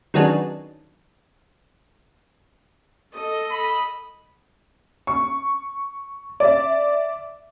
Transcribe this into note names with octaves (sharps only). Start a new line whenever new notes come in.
D#3 F#3 G#3 B3 C#4 D4
A4 D#5
B5
C#6
D5 E5